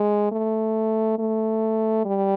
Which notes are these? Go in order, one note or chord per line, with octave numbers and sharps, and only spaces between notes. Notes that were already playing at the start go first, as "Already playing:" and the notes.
Already playing: G#3
A3
A3
G3